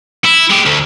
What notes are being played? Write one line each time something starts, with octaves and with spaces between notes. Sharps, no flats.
E4
G#3 G4
D2